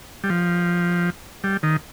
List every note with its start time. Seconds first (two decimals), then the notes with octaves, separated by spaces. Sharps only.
0.24 G3
0.30 F3
1.44 G3
1.63 D#3